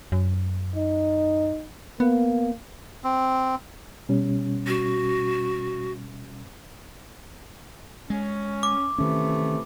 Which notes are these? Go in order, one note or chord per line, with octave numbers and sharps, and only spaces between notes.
F#2
D#4
A#3 B3
C4
B2 G3 C#4
F#4
G#3 C#4
D6
C3 D#3 E3 A3 C#4